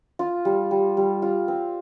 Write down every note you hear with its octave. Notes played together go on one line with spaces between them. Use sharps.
F4
G3
G3
G3
F4
C4